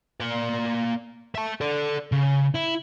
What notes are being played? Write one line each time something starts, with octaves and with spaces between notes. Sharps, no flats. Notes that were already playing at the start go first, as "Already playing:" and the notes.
A#3 D5
E5 A5
A4 D5
C#3
E4